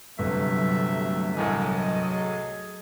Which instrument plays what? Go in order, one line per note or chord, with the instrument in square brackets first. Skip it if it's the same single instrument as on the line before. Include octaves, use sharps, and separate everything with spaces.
[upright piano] G1 [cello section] C3 F#3 A3 [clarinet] E5
[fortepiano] C2 A2 E3 [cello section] F#3 A4 D#5
[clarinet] G#4